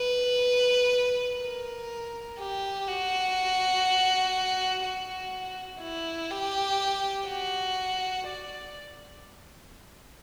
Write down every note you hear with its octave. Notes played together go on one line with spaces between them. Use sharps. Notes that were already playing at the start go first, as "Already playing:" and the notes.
Already playing: B4
A#4
G4
F#4
F#4
E4
G4
F#4
D5